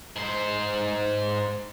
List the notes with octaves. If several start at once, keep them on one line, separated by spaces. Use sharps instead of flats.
G#2 C5